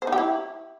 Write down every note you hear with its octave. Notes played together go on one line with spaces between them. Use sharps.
C5
D#4
G4
E4